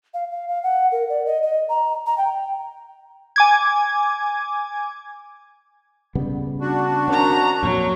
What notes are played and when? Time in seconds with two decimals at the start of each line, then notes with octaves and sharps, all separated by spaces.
0.14 F5
0.31 F5
0.48 F5
0.63 F#5
0.92 A#4
1.09 D5
1.26 D#5
1.43 D#5
1.69 A#5
2.06 A#5
2.18 G5
3.36 G#5 D6 G#6
6.15 C#3 G3 B3
6.61 D4 F#4
7.08 D#3 C4 C#4 A#5
7.63 F2 A#2 F#3